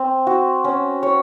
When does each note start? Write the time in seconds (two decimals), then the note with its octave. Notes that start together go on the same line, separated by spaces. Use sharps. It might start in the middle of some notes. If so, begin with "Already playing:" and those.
Already playing: C4
0.27 F#4
0.64 C#4
1.03 C#5